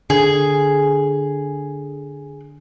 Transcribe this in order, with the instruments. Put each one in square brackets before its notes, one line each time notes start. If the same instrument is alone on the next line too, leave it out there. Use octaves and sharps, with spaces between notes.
[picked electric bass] D3 [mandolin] G#4